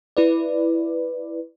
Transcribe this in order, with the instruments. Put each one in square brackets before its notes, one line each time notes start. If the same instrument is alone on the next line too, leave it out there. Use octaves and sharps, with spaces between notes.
[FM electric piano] E4 B4 D5